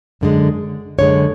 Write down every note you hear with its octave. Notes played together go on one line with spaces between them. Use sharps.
F#2 D3 G#3
F#2 D3 G#3 C#5